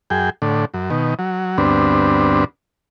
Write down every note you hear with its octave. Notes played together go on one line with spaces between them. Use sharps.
F#2 G#4 G5
A2 D3
F#2
B2 D#3
F#3
D2 G2 B3 C4 D4